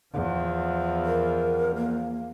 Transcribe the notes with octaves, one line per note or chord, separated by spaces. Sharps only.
E2 F3
A#4
A#3